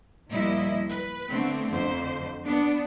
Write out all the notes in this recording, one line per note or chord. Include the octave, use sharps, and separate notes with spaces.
D#2 A#2 F3 G3 E4 D#5
B4
D3 A3 B3 C4
F2 D3 C5
B3 D4